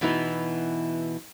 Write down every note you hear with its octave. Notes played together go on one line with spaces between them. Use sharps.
B2 E3 B3 D#4 E4